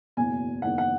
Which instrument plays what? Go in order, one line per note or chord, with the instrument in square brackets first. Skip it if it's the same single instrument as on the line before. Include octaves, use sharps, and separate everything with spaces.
[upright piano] F#1 E2 B2 G#5
F#1 E2 D#3 F#5
F#5